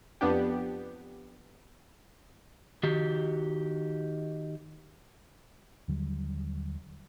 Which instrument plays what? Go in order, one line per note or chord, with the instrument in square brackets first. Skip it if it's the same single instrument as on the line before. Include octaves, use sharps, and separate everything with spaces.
[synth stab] F2 B3 D4 G4
[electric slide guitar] D#3 F#4 G4
[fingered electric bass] D#2 D3 F#3 G3